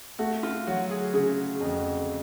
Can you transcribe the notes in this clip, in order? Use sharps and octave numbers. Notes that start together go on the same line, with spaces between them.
A3 F#4
F4
F#3 F#4
G#4
C#3 G#4
F2